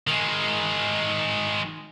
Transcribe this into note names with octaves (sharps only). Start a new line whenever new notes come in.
D#3 G#3